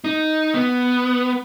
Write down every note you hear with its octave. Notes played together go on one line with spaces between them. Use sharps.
D#4
B3